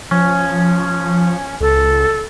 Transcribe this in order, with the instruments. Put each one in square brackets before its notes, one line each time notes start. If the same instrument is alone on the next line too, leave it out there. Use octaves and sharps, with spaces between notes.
[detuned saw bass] F3 [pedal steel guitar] C#4
[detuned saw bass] C#2 [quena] A4